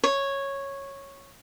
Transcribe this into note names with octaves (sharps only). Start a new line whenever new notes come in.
C#5